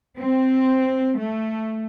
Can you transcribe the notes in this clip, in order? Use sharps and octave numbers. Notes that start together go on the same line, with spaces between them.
C4
A3